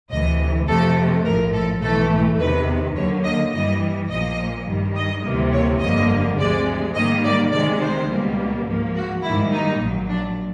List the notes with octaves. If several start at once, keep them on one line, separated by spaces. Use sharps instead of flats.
D2 C3 E3 D#5
F2 C3 F3 A3 A4
A#1 A2 F3 A#4
A4
B1 A2 E3 A3 A4
E2 C3 D#3 B4
D#2 D3 F#3 A#3 C#5
D#5
G2 E3 G3 D#5
A#1 A#2 F3 A#3 D#5
G2 D#3 G3
D#5
D2 C3 E3 G3 A#3
C#5
G1 F2 D3 G3 A#3 D#5
D2 C3 F3 G#3 D5
G#2 D#3 G3 A#3 D#5
D5
D2 C3 D#3 G#3 D5
C5
C#2 B2 G3 A#3
G#2 F3 A#3
F#4
G#2 D#3 G3 A#3 E4
D#4
A#1 A#2 F#3
D4